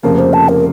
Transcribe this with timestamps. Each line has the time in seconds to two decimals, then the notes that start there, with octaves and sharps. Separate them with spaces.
0.03 F1 F2 C#3 F3 A#3 A#4
0.19 C5
0.33 A5
0.49 A#4